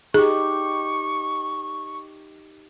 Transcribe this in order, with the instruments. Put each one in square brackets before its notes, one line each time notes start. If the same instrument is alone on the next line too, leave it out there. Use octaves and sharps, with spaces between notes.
[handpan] D#4 G4 [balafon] G#4 [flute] C#6